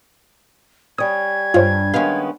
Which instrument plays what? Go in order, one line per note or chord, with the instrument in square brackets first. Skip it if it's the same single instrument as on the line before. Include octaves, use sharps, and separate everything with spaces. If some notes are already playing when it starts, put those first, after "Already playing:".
[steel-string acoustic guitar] G3 C#4 [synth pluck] D#6 [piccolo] G#6
[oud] G2 [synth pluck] F4 C5 C#5
[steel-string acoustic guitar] D#3 G#3 B3 [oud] C#4 F5